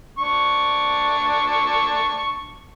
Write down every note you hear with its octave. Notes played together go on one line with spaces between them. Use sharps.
D4 C#6